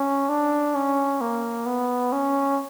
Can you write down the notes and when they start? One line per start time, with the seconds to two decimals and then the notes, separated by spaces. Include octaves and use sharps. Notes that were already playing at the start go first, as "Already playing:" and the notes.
Already playing: C#4
0.29 D4
0.75 C#4
1.21 A#3
1.66 B3
2.12 C#4